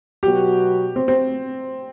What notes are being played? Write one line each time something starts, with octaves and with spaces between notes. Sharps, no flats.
B2 F#3 B3 F#4 G4
C4
C4